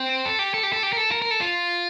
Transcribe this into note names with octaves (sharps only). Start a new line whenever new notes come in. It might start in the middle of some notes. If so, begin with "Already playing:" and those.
Already playing: C4
A4
G4
A4
G4
A4
G4
A#4
A4
A#4
A#4
A4
F4